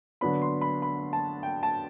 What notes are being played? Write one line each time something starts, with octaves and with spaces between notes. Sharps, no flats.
D3 F#3 B3 D4 B5
C6
B5
B5
A5
G5
A5